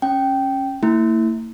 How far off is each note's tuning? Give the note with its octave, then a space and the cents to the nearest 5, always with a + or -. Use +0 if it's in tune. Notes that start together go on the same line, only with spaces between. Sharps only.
C#4 -15 G5 -10
A#3 -45 E4 -15